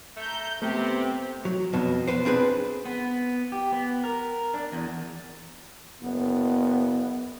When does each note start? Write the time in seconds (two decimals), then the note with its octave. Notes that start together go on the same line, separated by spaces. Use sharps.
0.17 A3 A#5 G6
0.62 C3 A3 B3 C4 G4
1.45 F#3
1.73 F2 B2 F#3
2.08 B3 B4 C5
2.25 C4 D4 G#4 B4
2.85 B3
3.52 G4
3.72 B3
4.04 A#4
4.54 D4
4.72 E2
6.02 F#1 B3